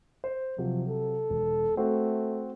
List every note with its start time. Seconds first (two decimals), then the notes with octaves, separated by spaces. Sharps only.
0.24 C5
0.58 C3 F3 F#3
0.89 A4
1.30 E1
1.77 A3 C4 F#4